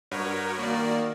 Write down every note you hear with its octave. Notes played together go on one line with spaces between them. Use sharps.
G2 F#4 A#4 C#5
D#3 A#3 D5